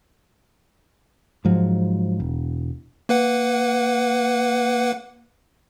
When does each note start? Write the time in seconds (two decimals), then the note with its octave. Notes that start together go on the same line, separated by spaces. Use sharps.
1.45 G#2 F3 F#3
2.20 E1
3.09 A#3 B4 F#5